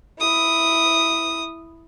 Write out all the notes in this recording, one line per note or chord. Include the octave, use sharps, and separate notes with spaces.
E4 D#6